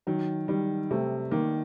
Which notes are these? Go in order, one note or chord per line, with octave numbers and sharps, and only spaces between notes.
D#3 F#3
D#3 G3
C3 A3
D#3 A#3